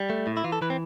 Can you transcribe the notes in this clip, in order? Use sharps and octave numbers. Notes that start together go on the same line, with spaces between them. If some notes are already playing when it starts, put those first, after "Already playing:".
Already playing: G3
A3
A2
E4
E3 F4
A4
E3 B4
C4